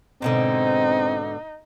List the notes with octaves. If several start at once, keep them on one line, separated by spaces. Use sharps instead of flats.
G#2 B2 D3 C4 D#4